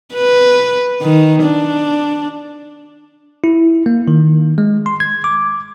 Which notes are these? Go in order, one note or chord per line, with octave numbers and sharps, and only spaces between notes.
B4
D#3
D4
E4
A#3
D#3
G#3
C6
G#6
D6